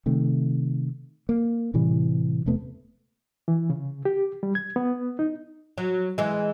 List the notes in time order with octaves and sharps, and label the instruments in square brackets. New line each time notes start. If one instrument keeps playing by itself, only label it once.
[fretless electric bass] C3 D#3 A3
A#3
A2 C3 E3 G3
E1 C3 A3 B3
[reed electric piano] E3
C#3
G4
G3
G#6
B3
D#4
[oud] F#3
E3 G#3